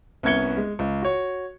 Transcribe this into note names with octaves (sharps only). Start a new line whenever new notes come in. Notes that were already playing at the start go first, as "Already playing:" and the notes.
C2 B3 C#4 G#6 C#7 G7
G#3
C#2
F#4 C#5